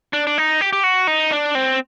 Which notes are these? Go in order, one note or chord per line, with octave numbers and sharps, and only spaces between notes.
D4
D4
D#4
G4
G4
F#4
D#4
D4
C4